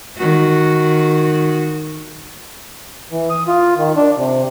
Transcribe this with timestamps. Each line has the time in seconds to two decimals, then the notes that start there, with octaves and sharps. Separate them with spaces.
0.17 D#3 F#4
3.11 E3
3.30 D#6
3.47 F4
3.77 D#3
3.96 D4
4.17 C3